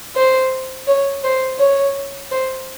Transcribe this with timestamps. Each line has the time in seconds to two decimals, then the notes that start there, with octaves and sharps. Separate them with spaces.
0.15 C5
0.87 C#5
1.23 C5
1.59 C#5
2.31 C5